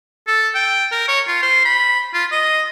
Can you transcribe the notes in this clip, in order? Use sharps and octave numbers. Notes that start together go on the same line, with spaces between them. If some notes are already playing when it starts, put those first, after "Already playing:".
A4
G5
A#4
C#5
F4
C5
B5
F4
D#5